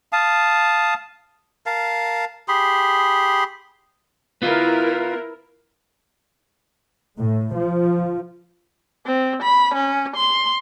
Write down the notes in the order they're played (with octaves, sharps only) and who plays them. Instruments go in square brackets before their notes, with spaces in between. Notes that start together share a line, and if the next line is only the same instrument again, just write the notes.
[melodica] F5 A5 D#6
A#4 F5 A5
G4 G#4 B5 C6
[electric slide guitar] B3 F4 [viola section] E4 A#4
[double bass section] A2
F3
[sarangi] C4
B5
C#4
C6